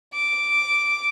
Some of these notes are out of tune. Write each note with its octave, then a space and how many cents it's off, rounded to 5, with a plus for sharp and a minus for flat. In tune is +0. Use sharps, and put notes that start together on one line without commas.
D6 -5